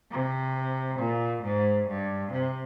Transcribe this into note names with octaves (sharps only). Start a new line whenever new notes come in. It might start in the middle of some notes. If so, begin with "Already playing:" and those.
C3
A#2
G#2
G2
C3